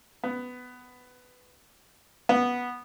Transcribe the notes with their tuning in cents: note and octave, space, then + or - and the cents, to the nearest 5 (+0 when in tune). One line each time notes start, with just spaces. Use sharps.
B3 +10
B3 -10